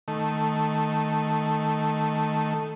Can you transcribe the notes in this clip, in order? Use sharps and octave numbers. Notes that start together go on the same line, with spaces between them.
D#3 A3